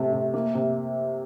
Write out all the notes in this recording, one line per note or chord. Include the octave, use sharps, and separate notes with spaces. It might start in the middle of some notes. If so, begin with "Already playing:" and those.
Already playing: C3 A3
C3
A#3
C3